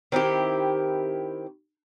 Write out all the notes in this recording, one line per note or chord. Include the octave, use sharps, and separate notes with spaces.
D#3 C4 E4 G4